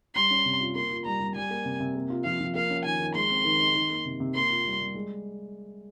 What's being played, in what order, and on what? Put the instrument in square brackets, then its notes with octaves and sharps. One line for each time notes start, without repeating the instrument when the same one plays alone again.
[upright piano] G3 [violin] C6
[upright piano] C#4
C3
F4
[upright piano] A#3 [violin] C6
[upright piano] F4
[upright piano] G3 [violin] A#5
[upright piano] G3
[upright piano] G3 [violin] G#5
[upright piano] A#3
C3
C3
A#3
F4
[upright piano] F3 [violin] F5
[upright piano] F3
[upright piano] A#3 [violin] F5
[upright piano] C#4
[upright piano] D#3 [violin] G#5
[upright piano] D#3
[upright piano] G#3 [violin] C6
[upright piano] C4
D#3
D#4
D#3
A#3
C3
C3
[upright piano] A#3 [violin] C6
[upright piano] F4
G3
G3
G#3